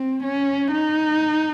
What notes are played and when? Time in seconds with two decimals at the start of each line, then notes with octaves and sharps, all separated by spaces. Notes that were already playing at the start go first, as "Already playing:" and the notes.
Already playing: C4
0.23 C#4
0.71 D#4